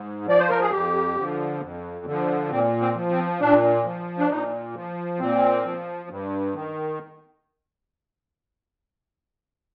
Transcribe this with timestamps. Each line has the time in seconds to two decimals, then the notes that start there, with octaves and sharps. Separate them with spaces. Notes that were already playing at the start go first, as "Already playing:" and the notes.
Already playing: G#2
0.26 F3 D5
0.40 C5
0.50 A#4
0.61 G#4
0.71 F2 G4
1.16 D3 F3
1.61 F2
2.06 D3 F3
2.51 A#2 C4
2.81 C4
2.95 F3
3.11 C4
3.40 A#2 D4
3.85 F3
4.18 D4
4.30 A#2 D#4
4.75 F3
5.20 A#2 C4
5.64 F3
6.09 G2
6.54 D#3